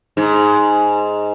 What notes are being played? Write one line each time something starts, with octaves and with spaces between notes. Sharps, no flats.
G#2